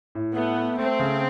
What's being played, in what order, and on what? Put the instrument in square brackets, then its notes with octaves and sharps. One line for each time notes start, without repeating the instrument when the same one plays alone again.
[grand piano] A2
[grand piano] A3 [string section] B3
[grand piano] A3
[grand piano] A3 [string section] C4
[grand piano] C#3